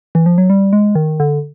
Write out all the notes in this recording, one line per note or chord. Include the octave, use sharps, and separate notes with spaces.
E3
F3
F#3
G3
G#3
D#3
D3